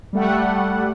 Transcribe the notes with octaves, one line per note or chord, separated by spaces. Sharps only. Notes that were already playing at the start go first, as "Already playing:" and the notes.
G3 A3 F#5